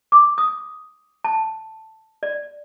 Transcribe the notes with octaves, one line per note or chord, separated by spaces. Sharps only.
D6
D#6
A5
D5